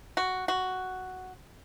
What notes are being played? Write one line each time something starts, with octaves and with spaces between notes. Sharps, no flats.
F#4
F#4